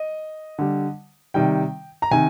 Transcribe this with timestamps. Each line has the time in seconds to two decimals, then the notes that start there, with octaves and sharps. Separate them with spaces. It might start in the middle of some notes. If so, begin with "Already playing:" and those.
Already playing: D#5
0.58 D3 G3
1.34 C3 D#3 G3 G5
2.02 A#5
2.11 C3 D#3 G#5